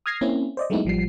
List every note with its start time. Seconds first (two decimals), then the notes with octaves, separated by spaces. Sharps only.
0.06 D#6 F6 G#6 A#6 C7
0.21 A#3 C4 C#4 E4
0.57 C5 D5 D#5
0.70 F#3 G#3 A3 B3 D#4 E4
0.85 A1 F3 G3 C7